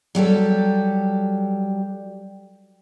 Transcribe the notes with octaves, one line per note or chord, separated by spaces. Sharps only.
F#3 G3 G4 A4